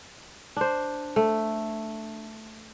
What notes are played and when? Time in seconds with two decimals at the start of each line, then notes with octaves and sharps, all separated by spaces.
0.56 D4 C5
1.16 A3